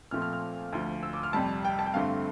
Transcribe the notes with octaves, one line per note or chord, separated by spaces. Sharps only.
A#2 F3 A3 C4 F6
F6
F6
D2 D3 F3
E6
D6
F6
F2 C3 G3 A5
G5
A5
G5
G2 D3 A3 C4 F5